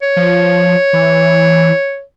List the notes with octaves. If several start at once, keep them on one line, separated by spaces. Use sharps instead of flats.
C#5
F3
E3